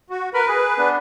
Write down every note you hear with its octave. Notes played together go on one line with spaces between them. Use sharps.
F#4
A#4 B4 B5
G#4
B3 D4